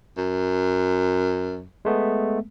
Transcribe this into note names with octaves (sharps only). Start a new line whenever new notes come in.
F#2
G#3 A3 B3